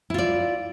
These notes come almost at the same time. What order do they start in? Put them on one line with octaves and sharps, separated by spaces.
E4 F4 D5